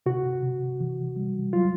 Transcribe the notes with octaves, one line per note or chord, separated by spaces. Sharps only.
C3 F#4
C3
E3
G3
F#3 F4